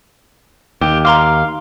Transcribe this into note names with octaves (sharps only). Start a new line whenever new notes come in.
D#2 G4
F5 A#5 C6 D6